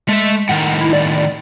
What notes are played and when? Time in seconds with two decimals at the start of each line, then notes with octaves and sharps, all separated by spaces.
0.09 G#3 A3 E5
0.49 A2 D#3 F#5
0.81 E4
0.93 D5